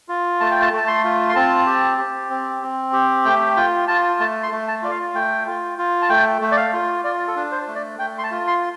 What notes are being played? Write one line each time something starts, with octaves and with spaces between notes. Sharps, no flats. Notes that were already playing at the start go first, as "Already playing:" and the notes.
F4
A3 A5
G5
A5
A3 A5
C6
F4
C6
C4 A5
G4
G4
C4
C4
G4
A3 G5
F4 G5
F4 A5
A3 A5
C6
A3
A5
F4 D5
F5
A3 G5
F4
F4
A5
A3 G5
A3
D5
F5
F4
F4 D5
A4
D4
C5
A3
D5
A3 G5
C6
A5
F4
C6